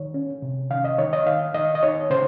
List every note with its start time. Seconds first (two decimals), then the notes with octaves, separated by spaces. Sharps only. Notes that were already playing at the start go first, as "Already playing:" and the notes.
Already playing: D#3 C#5
0.14 C#4
0.42 C3
0.70 D#3 F5
0.84 D#5
0.98 D#3 C#5
1.13 D#5
1.26 D#3 F5
1.54 D#3 D#5
1.75 D#5
1.83 D#4 C#5
2.10 C#3 C5